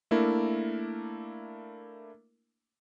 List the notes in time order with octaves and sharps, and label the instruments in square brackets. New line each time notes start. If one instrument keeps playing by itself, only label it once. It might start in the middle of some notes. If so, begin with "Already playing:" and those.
[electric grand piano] A3 A#3 D4 E4 A#4